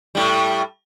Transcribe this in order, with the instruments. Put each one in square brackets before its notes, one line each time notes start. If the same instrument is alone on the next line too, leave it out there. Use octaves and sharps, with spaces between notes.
[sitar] A2 G3